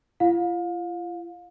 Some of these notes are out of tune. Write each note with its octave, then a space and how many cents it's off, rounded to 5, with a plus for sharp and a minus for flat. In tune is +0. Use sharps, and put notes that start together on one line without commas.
F4 -40 F5 +30